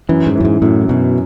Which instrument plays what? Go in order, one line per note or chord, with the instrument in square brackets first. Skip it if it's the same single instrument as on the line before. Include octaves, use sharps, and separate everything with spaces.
[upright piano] F#2 [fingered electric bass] E3
[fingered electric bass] G#2
[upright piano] E3
[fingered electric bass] F#2
G#2
[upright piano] F#2 [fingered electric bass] A2
[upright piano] F#2 [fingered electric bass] B2